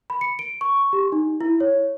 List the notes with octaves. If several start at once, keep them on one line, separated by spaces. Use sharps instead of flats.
B5
C#7
D7
C#6
G4
D#4
E4
C#5